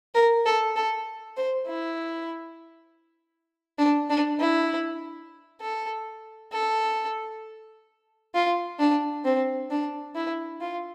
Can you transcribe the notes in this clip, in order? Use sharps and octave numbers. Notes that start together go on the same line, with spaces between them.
A#4
A4
A4
C5
E4
D4
D4
E4
A4
A4
F4
D4
C4
D4
E4
F4